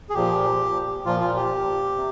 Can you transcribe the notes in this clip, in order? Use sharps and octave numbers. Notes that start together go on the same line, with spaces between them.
G#4
A#2 F3 G4
A#2 F3 F4
F4
G4
C3